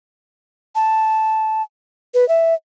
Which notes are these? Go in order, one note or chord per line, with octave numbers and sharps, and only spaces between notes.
A5
B4
E5